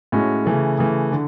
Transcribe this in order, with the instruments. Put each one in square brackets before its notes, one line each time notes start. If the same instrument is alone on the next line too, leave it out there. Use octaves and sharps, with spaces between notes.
[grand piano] A2 G#3 C#4 F#4
C#3 E3 A3
C#3 E3 A3
D3